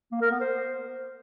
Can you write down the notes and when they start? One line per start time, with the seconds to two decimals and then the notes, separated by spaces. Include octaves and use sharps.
0.12 A#3
0.21 A#4
0.31 B3
0.40 C5